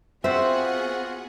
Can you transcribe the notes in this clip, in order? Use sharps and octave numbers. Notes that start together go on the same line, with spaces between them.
B3 C4 F4 F#4 G#4 C5 E5 F#5